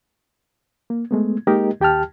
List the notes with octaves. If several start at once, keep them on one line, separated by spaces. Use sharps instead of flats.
A#3
G#3 A3 B3
G#3 A#3 D#4 G4 A#4 D#5
D#2 G4 G5 A5 F6